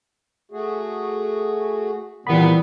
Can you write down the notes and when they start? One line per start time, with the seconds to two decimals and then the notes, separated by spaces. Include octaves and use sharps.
0.51 A3 F#4 G#4
2.27 A#2 D#3 E3 G3 B3 C4 B5